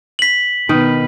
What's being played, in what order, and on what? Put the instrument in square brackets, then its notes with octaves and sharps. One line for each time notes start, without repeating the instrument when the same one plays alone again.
[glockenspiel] B6 F#7
[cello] B2 B4 [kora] D#3